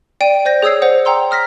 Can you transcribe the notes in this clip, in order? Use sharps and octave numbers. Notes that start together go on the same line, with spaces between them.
D5 G5 D7 D#7
C5 D5 G6 A#6
G#4 C#5 D#6 E6 G#6 C7
C5 D5 F#5
F#5 G5 A#5 C6 E6
D#6 F6 A#6 B6